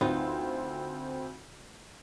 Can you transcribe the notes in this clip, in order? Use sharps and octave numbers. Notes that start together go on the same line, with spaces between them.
D2 C4 D#4 F4 B4